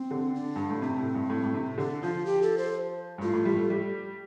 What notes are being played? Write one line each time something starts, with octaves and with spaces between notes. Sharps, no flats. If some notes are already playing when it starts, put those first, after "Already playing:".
Already playing: C4
D3
D4
G2
A2
C3 C4
A2
G2
A2
A2
C3
D3 D4
F3 F4
G4
A4
C5
G2
A2 F4
A2
G3
A3
G3